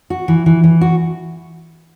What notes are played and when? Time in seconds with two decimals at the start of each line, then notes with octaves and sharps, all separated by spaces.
0.10 F#4
0.28 E3
0.46 E3
0.64 E3
0.81 F#4